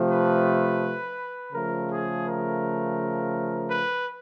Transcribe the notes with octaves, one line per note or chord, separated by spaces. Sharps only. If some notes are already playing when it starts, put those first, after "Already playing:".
Already playing: C3 F3 A3
B4
C#3 F3 A3 A#4
G#4
A#4
B4